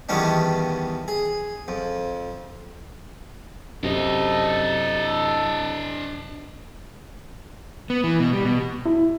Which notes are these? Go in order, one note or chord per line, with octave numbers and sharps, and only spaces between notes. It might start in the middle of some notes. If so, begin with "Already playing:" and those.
E2 D#3 G3 B3 C#4 D4
G#4
F2
F#2 C3 D4 A4 D#5
B3
E3
B2
G3
B2
E4